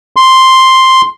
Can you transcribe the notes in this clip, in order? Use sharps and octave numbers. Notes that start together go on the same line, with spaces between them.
C6